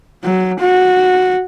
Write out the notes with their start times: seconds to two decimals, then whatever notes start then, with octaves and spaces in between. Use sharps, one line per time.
0.23 F#3
0.59 F#4